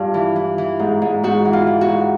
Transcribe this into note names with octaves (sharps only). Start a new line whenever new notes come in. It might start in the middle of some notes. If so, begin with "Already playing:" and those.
Already playing: G2 F4
E3
E3
E3
G#2
G#2
G#2 F#4
E3
F4
E3
F#4
G#2